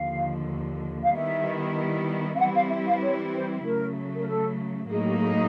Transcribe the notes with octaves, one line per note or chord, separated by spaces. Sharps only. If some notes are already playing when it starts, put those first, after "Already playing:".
Already playing: D#2 D3 F3 F5
F5
D#3 G3 B3 E4 E5
F5
E3 G3 C4 E4 F#5
F5
E5
F5
C#5
C5
C#3 F#3 A3 A#4
A#4
A4
A2 F#3 A#3 D#4 G#4
G4
G#4